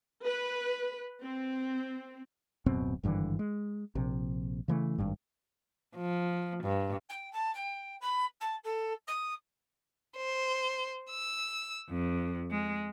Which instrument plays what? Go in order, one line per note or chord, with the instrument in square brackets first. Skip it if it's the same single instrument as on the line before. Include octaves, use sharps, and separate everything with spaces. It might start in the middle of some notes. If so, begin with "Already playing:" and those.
[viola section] B4
C4
[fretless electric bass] D1 F#2 B2 C4
G#1 G2 D3 E3
G#3
A#1 C3
C#3 E3 A3
G#1 G2
[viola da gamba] F3
G2
[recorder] G5
A5
G5
B5
A5
A4
D#6
[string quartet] C5
E6
F2
G#3